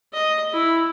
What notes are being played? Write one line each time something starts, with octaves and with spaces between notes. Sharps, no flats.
D#5
E4